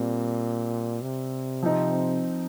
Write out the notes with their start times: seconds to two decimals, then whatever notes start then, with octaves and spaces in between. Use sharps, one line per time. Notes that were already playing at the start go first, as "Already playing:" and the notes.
Already playing: A#2 G3 C4
1.02 C3
1.63 F3 C4 D#4